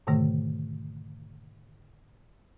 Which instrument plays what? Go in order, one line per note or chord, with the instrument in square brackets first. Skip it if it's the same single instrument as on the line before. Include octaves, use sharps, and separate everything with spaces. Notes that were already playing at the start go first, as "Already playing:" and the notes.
[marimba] G#2 B2 D3 D#3 A3